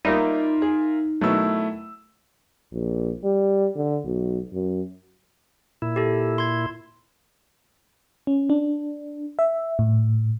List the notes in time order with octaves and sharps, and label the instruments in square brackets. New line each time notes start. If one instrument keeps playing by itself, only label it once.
[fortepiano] G3 A#3 [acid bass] D#4 [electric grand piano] F4 A#4 E5
[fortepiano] G#4
[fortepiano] B2 D#3 F#3 [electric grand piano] A3 E4 E6
[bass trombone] A#1
G3
D3
B1
F#2
[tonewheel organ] A#2 E4
[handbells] G4 A4
C6 G#6
[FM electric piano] C#4
D4
E5
A2